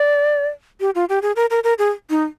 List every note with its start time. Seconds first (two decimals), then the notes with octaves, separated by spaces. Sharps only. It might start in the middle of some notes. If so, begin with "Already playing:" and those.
Already playing: D5
0.81 G4
0.95 F4
1.09 G4
1.22 G#4
1.36 A#4
1.50 A#4
1.64 A#4
1.79 G#4
2.10 D#4